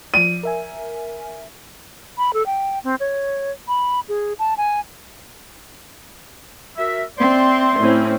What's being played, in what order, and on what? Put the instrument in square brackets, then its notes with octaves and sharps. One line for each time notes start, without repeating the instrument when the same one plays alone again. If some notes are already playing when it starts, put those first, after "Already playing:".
[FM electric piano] F3 D5 [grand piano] D#7
[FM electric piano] A#4 E5 G#5
[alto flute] B5
A4
G5
C4
C#5
B5
G#4
A5
G#5
[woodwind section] F#4 A#4 E5
[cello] C4 D5 [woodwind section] C5 E5 C6
[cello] A2 [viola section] C4 C#4 E4